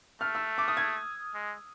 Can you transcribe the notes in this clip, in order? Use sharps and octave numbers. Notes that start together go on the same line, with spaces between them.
A3 F6
E6
D6
D#6
G#6
G#3